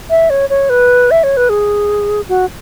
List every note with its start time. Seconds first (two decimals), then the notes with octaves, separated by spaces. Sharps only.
0.10 E5
0.30 C#5
0.50 C#5
0.70 B4
1.11 E5
1.24 C#5
1.37 B4
1.49 G#4
2.29 F#4